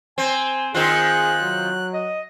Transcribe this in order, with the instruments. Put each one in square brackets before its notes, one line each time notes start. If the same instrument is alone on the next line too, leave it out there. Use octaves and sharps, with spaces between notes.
[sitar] C4 [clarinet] G#5
[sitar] D#3 C4 F4 [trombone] G#4 [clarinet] C5 [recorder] F#6
[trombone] F#3
[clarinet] D#5